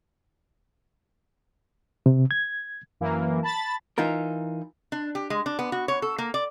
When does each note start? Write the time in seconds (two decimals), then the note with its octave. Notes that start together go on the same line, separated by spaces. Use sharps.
2.06 C3
2.31 G#6
3.01 F#2 E3 A#3 A#4
3.43 A5 B5 A6
3.98 E3 D#4 F4 A#4
4.92 D4
5.15 G4
5.30 G#3
5.46 D4
5.59 B3
5.72 F#4
5.88 C#5
6.02 A4
6.18 A#3
6.34 D5